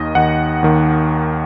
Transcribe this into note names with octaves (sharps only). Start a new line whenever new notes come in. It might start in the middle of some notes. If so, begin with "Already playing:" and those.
Already playing: D#2 D#3 D#5
D#2 D#3 F#5
D#2 D#3